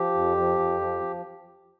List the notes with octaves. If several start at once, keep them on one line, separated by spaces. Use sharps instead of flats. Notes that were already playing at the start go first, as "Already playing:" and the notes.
Already playing: F3 G4
F2
F3
F2
F3